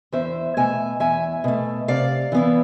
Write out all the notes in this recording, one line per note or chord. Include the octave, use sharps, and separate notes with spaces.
E2 C5 E5
B2 A3 E5 G#5
E2 E5 G#5
B2 A3
C3 D5 F5
E3 B3 E4